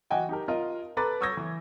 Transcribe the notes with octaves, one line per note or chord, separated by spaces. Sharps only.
E3 F#4 D#5 G5 G#5
D#4 G4 A#4
F4 A#4 D#5
A4 B4 A#5 B5 D6 A6
C#6 D#6 E6 G6 G#6 A#6
E3